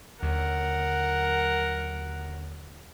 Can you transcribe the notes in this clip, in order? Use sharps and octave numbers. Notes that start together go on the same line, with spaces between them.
D#2 D3 F#3 A#4 F#5